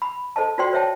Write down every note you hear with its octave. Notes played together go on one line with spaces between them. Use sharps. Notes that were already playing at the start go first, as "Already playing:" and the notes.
B5
A4 C5 D#5 A5
F4 F#4 C5 D5 G5 C6
C5 C#5 E5 G5 A5